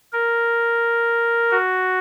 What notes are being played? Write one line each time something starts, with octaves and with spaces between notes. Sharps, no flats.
A#4
F#4